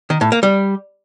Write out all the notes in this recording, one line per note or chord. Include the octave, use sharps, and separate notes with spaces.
D#3
A2
A#3
G3